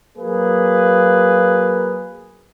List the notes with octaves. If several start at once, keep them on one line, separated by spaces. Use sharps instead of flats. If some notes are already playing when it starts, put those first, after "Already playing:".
F#3 A#3 G#4 B4